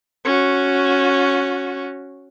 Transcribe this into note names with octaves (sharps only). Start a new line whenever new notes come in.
C#4 F#4